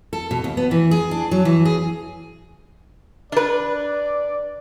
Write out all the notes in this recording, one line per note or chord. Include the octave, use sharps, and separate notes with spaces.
A4
B2
D#2
B3
E3
G#4
D4
F#3
E3
G#4
D4 B4 D5